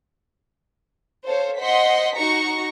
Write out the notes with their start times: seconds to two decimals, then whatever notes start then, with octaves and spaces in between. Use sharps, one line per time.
1.26 A4 C5 C#5 F5
1.59 C5 D#5 F#5 C6 B6
2.17 D#4 F#4 A#5 C#6